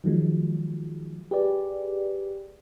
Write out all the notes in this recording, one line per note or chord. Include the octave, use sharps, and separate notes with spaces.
D#3 F3 F#3 G#3
G4 G#4 B4 D5